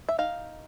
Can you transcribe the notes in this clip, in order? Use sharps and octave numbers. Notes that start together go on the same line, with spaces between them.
E5
D#4 F5